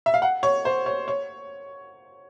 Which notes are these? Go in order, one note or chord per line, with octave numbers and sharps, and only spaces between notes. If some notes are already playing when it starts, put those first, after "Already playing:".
E5
F5
F#5
C#5
C5
C#5
C#5